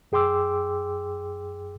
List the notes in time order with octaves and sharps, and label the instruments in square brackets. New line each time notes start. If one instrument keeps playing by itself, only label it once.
[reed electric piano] F#2 G#4 G5 C6 D6 E6